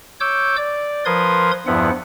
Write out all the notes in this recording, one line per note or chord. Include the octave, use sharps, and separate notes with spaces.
C#5 D6 E6 G6
D5
F3 A#4 B4 C6 D#6 G#6
E2 G2 F3 B3 E4 F#5